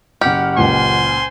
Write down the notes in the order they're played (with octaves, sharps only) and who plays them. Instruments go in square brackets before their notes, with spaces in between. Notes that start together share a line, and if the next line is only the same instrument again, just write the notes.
[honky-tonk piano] F#1 F#5 F6 [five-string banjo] G4
[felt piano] C#2 A#2 [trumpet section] C5 G#5 C6